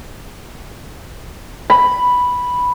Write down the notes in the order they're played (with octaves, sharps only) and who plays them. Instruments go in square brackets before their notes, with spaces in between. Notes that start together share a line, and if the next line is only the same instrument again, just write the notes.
[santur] B5